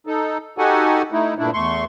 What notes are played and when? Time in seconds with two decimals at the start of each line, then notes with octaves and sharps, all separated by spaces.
0.07 D#4 A4
0.58 D#4 F#4 G4 A4 F#5 G#5
1.12 A3 D#4 E4
1.38 G2 A#2 A3 D4 E4
1.54 E2 A3 C6 C#6